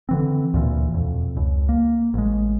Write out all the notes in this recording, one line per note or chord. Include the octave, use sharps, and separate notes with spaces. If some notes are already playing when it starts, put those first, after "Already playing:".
D3 E3 C4
D2 A#2 E3
E1 F2
C#2
A#3
A1 G#3